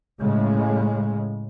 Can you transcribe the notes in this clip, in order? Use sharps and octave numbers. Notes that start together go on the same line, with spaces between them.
A2 C#3 G#3